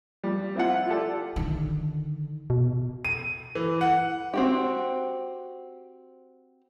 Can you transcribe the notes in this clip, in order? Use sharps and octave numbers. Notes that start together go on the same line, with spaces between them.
F3 G3
C4 E4 F4 F#5
F4 G4 A4 D5
D3 D#3
B2
D#7
E3
F#5
C4 F#4 G4